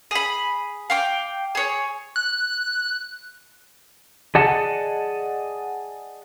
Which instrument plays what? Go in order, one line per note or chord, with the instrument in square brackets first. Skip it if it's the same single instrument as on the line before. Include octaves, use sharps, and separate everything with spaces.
[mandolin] G#4 B5
F5 G5 D6
G#4 C#5
[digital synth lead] F#6
[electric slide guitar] G#4 D5 D#5 F#5 A5